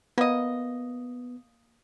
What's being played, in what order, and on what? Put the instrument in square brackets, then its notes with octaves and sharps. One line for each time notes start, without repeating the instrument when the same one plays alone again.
[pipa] A#3 D#5 [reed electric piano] B3